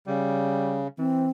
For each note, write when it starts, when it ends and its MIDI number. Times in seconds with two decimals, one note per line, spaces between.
0.07 0.88 49
0.07 0.86 55
0.98 1.29 52
0.98 1.30 60